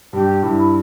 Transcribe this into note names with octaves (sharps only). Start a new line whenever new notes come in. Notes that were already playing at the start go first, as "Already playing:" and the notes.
G2 G4
G2 E4